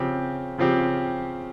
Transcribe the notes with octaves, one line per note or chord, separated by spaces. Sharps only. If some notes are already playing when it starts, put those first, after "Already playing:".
Already playing: C#3 F3 C4 G4
C#3 F3 C4 G4